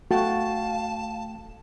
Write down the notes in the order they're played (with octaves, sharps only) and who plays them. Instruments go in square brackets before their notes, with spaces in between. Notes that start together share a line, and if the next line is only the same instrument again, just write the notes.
[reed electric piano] A3 G5 A6 [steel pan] F#4 [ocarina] F5 [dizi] A5